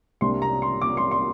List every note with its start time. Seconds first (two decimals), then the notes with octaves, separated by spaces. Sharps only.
0.21 C2 C3 G3 A#3 D4 C6
0.42 A#5
0.62 C6
0.82 D6
0.97 C6
1.11 C6